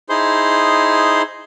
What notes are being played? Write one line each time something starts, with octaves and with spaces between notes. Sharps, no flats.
D#4 E4 G#4 C5 C6